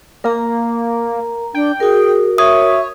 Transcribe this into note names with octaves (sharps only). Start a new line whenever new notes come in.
A#3 A#4 A#5
D4 G5
F#4 G#4 A#4
C#5 E5 D#6